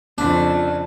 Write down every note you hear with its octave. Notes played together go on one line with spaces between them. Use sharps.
F2 C#3 D4